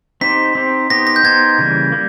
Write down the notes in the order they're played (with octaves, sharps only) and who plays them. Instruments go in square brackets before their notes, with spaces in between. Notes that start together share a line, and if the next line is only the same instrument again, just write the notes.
[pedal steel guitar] C4 D#4 G4 C5 [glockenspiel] B6
[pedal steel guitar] C4 D#4 G4 C5
[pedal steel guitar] B3 D#4 G4 C5 [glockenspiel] A#6
[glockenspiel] A#6
G6
[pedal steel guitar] B3 D#4 G4 C5 [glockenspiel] G#6
[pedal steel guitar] C#3 E3 G3 A#3
G3 A#3